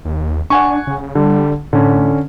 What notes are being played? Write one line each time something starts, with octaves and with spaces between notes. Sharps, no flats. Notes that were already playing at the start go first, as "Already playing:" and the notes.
D#2
D4 F#5 G#5 C#6
C#3
D3 G3
A2 D3 C#4